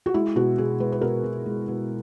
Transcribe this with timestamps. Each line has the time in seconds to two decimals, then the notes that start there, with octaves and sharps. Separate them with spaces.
0.06 F#4
0.14 G#3 E4
0.36 B2 F#4
0.58 B2 G#4
0.80 G#3 B4
0.92 B4
1.01 B2 A#4
1.24 B2
1.46 G#3
1.68 B2